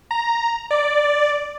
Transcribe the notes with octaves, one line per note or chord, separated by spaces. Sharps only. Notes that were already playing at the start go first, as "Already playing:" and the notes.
A#5
D5